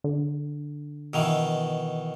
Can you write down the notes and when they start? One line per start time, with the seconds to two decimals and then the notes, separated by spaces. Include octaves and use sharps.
0.04 D3
1.14 B2 D#3 E3